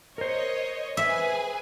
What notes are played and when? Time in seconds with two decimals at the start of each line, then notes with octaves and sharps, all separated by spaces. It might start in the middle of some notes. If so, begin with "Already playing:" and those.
0.18 A#4 C5 C#5 D#5
0.97 G#4 B4 E5 G#5